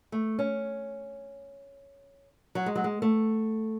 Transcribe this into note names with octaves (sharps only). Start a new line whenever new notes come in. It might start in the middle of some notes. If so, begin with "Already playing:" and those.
A3
C#4
F#3
G#3
F#3
G#3
A3